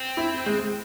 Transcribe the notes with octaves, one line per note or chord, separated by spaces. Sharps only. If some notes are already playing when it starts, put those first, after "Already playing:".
Already playing: C4
E4
G#3